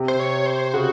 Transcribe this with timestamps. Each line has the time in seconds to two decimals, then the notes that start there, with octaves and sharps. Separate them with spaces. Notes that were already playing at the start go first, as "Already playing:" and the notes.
Already playing: C3
0.08 C5
0.20 C#5
0.46 C5
0.74 C#3 F#4